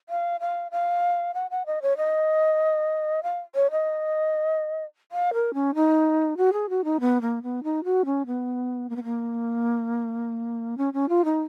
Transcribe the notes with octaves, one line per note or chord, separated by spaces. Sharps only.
F5
F5
F5
F#5
F#5
D#5
C#5
D#5
F5
C#5
D#5
F5
A#4
C#4
D#4
F#4
G#4
F#4
D#4
B3
A#3
B3
D#4
F#4
C#4
B3
A#3
B3
A#3
C#4
C#4
F4
D#4